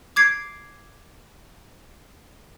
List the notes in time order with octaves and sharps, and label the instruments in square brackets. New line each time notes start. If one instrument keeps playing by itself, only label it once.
[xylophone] D6 G#6 C7 D7